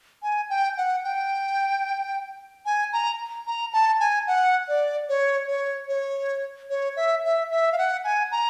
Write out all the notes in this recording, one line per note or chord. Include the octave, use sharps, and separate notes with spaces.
G#5
G5
F#5
G5
G#5
A#5
A#5
A5
G#5
F#5
D5
C#5
C#5
C#5
C#5
E5
E5
E5
F5
F#5
G#5
A#5